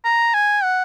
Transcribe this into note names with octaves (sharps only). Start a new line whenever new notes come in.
A#5
G#5
F#5